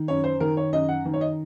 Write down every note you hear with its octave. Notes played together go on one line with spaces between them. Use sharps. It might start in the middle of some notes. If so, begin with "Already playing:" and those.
Already playing: D#3
F#2 C#5
C5
D#3 A#4
C#5
F#2 D#5
F#5
D#3
C#5
D#5